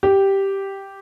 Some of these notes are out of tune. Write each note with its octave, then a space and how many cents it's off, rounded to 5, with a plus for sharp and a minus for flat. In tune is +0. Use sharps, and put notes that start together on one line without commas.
G4 -5